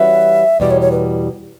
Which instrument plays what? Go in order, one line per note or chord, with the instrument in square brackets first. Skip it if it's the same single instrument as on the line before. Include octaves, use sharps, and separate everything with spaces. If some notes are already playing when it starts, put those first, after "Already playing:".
Already playing: [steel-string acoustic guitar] E3 G3 C#4 F#4 B4 [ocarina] E5
[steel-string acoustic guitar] E2 B2 G3 [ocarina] D5
[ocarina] C#5
C#5
B4